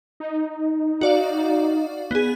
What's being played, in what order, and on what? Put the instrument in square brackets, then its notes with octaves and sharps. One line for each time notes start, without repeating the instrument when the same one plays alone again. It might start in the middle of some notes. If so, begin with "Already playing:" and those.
[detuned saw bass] D#4
[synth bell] F#4 D5 F5
B3 G#4